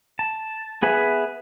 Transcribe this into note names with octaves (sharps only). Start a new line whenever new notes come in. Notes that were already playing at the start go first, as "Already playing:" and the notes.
A5
B3 G#4 B4 E5